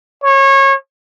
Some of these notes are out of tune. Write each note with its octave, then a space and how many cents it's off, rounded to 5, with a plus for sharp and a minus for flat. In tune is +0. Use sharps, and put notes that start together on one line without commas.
C#5 -25